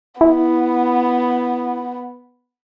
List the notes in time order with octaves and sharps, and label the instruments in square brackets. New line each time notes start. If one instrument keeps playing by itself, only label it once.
[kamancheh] B3 [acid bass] E4